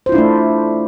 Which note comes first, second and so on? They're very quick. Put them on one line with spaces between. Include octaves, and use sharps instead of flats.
C5 F4 E4 D4 A3